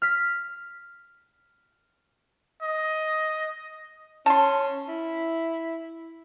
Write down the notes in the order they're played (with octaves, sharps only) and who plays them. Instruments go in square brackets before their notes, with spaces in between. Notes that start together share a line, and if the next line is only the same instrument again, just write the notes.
[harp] F6 B6
[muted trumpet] D#5
[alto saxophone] C#4 [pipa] A5 C6
[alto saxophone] E4